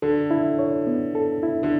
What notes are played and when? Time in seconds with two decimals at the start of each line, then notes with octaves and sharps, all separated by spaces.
0.02 D3 A4
0.31 E4
0.59 C#5
0.87 B3
1.15 A4
1.43 E4
1.63 D3